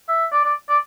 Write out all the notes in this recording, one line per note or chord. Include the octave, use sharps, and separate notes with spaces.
E5
D5
D5
D5